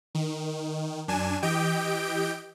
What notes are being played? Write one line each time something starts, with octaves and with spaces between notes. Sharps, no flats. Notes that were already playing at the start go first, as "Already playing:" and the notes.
D#3
F#2 D4 G#5 E7
E3 G4 D#5 G5 G6 D7